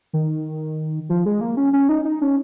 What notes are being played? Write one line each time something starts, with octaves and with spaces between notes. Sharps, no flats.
D#3
F3
G#3
A#3
C#4
C#4
D#4
D#4
C#4